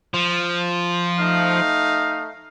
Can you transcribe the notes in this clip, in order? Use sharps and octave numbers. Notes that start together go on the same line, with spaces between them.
F3
A3 D#4 F5